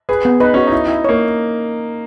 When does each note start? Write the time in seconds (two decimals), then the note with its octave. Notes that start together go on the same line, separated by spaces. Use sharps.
0.09 G#4 B4
0.25 B3
0.40 D#4 B4
0.54 C#4 F#4
0.67 D#4 E4
0.88 E4
1.04 A#3 C#5